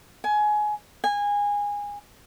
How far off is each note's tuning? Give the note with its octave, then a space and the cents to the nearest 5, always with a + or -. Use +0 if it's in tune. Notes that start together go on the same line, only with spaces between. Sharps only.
G#5 +20
G#5 -20